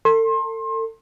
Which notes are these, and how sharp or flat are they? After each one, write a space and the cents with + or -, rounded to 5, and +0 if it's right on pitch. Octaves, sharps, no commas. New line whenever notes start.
A4 +35 C6 +30